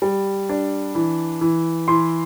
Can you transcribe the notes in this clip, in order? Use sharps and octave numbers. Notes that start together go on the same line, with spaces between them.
G3
D4
E3
E3
E3 C6